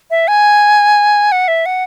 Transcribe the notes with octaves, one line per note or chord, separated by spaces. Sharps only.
E5
G#5
F#5
E5
F#5